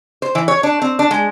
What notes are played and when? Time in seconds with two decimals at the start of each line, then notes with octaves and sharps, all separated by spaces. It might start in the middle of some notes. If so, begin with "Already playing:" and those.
0.22 C5
0.35 E3
0.48 C#5
0.63 D4
0.82 C4
0.99 D4
1.11 G#3